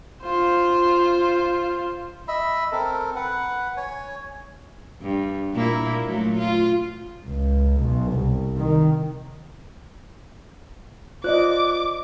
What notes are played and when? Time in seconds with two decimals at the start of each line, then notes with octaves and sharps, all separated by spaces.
0.23 F4 C5
2.28 D#5 E5 B5
2.72 C4 A4 A#4
3.16 B4 F#5
3.77 C#5 G#5
5.02 G2
5.54 A#2 A#3 E4
6.03 A#2 F#3 A3
6.38 F4
7.27 C#2
7.81 B1
8.13 C2
8.58 D#3
11.24 F4 C5 D5 D#5 D6 F#6